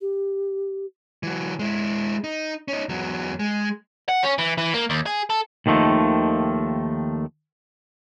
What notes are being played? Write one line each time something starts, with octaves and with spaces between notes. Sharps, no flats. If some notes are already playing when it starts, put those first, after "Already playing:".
G4
E3 F#3
G#3 E4
D#4
C#4 D#4
E2 F#3
G#3
F#5
C#4
E3
E3
A#3
D#2
G#4
A4
D#2 D#3 F3 A3